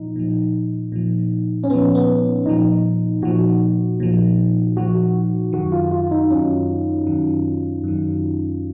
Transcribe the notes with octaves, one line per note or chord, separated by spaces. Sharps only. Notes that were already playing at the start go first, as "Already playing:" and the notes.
Already playing: A#2 F3 D#4
A#2 F3
A#2 F3
C#4
A#2 F3 B3
B3
A#2 F3 D#4
A#2 F3 F#4
A#2 F3
A#2 F3 F#4
F#2 D#3 F#4
F4
F4
D#4
F#2 D#3 C#4
F#2 D#3
F#2 D#3